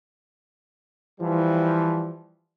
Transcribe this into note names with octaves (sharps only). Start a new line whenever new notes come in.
E3 F3 G3